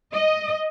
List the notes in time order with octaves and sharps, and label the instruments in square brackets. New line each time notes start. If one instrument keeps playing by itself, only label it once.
[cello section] D#5